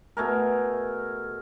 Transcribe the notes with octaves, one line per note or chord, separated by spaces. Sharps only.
B2 A3 G#4 A#4